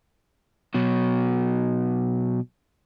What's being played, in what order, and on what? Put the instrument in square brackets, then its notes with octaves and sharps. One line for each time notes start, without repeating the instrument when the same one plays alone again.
[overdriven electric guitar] B2 F#3